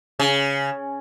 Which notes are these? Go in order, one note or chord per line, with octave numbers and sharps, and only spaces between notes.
C#3